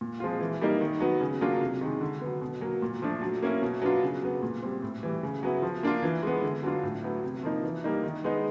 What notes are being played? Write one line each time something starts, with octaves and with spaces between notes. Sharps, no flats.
A#2
F3 G#3 C4 F4
E3
G3 A#3 D#4
D#3
F#3 B3
C#3
F#3 A#3 D4 F4
C3
D#3 G#3
D3
F#3 B3
B2
F#3 A#3
A#2
F3 A3 D4
F#3
A#3 C#4 E4
B2
F#3 B3 D4 F4
C#3
F#3 B3
A#2
G3 C4
A2
E3 G3
C#3
F#3 B3 E4
F3
A#3 D4 F4
E3
G#3 B3
D3
F#3 B3 D4 F4
A2
F#3 B3 E4
C3
F3 A#3 D#4
E3
G3 A#3 D#4
D#3
G#3 B3 D#4